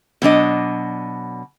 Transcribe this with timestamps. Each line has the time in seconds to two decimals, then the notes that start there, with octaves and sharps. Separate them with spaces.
0.22 B2 F#3 D4 D#5